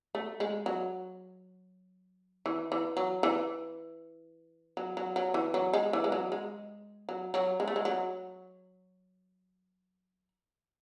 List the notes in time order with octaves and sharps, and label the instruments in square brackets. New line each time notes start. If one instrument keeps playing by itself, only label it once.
[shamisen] A3
G#3
F#3
E3
E3
F#3
E3
F#3
F#3
F#3
E3
F#3
G#3
E3
G#3
F#3
G#3
F#3
F#3
G#3
A3
G#3
F#3